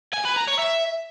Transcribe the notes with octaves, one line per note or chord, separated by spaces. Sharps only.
G#5
B4
A#5
C#5
E5